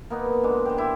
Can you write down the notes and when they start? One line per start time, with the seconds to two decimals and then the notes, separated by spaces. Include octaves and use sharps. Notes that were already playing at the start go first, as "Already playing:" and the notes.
0.10 A#3 B3 D#4 B4
0.43 D3 G#3 D6
0.65 G4 C5
0.78 E4 G4